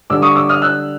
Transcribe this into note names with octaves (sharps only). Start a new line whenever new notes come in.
D3 G3 D6 E6
C#6 D#6
D6 E6
D#6 F6
E6 F#6